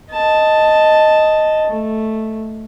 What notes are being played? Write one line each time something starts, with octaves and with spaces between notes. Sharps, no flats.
D#5 A5
A3